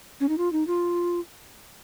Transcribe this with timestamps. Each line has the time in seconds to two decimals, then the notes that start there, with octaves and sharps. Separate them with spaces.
0.20 C#4
0.29 D#4
0.38 F4
0.52 D#4
0.67 F4